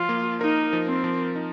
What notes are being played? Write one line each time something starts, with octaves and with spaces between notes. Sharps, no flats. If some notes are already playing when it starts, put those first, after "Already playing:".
Already playing: F3 F4
A#3
D#4 A#4
F3
C4
F3
D#4